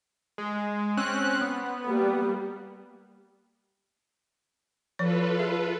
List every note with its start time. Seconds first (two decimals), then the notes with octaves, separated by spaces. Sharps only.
0.38 G#3
0.97 C4 C#4 F#6
1.41 B3
1.87 G3 A#3
4.99 F3 F4 A4 B4 C#5
5.39 G#4 E5